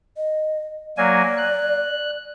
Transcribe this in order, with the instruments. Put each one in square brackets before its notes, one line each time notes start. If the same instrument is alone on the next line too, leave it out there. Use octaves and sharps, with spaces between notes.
[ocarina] D#5
[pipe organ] F#3 A#3 G#5 [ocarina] D5
[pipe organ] F#6